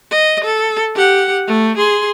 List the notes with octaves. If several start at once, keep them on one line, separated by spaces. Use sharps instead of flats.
D#5
A4
G4 F#5
A3
G#4 C6